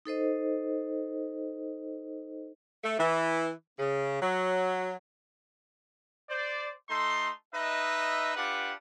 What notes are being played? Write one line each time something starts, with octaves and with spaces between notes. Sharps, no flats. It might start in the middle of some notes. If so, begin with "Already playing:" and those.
D#4 A4 C5 D#5
A3
E3
C#3
F#3
C5 D5
A3 D#4 A4 C6
D#4 B4 D#5 E5
D4 F4 G4 B4 F#5